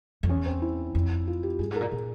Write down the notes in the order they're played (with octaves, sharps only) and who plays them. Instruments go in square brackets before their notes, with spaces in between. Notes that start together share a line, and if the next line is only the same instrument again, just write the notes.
[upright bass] F2
[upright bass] E2 [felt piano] C#4
[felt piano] C4
E4
[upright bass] F2
[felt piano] F4
G4
[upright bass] G2 [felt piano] G#4
[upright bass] G#2
[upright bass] A#2 [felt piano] A#4
[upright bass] A#2 [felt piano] G#4